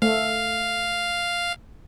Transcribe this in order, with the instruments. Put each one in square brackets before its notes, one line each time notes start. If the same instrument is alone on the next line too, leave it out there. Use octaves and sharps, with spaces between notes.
[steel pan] A3 [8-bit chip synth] F5